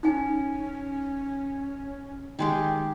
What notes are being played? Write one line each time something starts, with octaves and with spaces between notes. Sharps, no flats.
C#4 D#4 G#5
D#3 G#3 G4